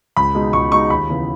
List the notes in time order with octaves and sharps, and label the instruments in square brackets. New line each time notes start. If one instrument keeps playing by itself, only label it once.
[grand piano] C#2 B5
B2 G#3 D#4
C#2 C#6
B2 G#3 D#4 C#6
D#2 B5
C#3 E3 B3